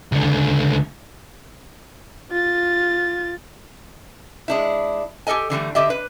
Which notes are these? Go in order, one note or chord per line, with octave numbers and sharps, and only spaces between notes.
C#2 D3
F4 A6
G#3 D4 E4
G4 A4 A#4 D#5 G#5
D3 E3 G3 A3
D3 G4 D#5 E5
B4